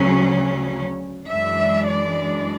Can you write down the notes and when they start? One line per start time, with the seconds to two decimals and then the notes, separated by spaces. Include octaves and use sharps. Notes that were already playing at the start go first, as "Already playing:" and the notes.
Already playing: D2 C#3 F#3 C#4
1.28 F#2 E3 G#3 D4 E5
1.88 D5